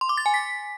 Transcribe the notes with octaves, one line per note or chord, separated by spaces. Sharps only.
C6
D6
A6
G#5
B6